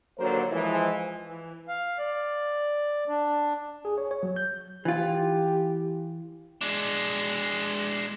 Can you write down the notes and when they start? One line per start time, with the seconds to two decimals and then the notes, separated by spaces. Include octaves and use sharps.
0.19 D#2 D3 F#3 A#3 A#4 C5
0.52 E3 F3 G#3
1.26 E3
1.68 F5
1.98 D5
3.08 D4
3.85 G#4
3.98 C#5
4.11 C#5
4.23 F#3
4.36 G6
4.85 E3 F4 G4
6.61 G#3 D4